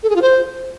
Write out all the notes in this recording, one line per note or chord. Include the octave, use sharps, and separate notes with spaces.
A4
G#4
F4
C5